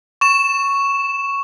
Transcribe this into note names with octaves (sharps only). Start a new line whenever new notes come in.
C#6 E7